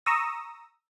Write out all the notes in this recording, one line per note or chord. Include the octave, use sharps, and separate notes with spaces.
A#5 C#6 D#6 E6 A#6